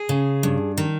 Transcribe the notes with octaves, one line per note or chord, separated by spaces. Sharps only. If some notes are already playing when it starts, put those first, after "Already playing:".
Already playing: G#4
C#3
G2
D#3